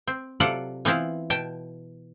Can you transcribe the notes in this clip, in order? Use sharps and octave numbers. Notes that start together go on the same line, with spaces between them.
C4
C3 F#3 F4 A4 D5 F#5
E3 B3 C4 E4 F4
B2 G5 A5